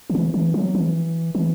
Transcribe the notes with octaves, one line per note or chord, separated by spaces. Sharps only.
D#3
E3
E3
F#3
E3
E3